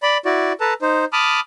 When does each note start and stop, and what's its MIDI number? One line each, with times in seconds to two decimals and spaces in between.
0.03 0.18 74
0.03 0.18 83
0.25 0.53 64
0.25 0.53 66
0.25 0.53 74
0.60 0.74 69
0.60 0.74 71
0.60 0.74 81
0.60 0.74 82
0.82 1.05 63
0.82 1.05 72
1.13 1.40 81
1.13 1.40 83
1.13 1.40 86
1.13 1.40 87
1.13 1.40 89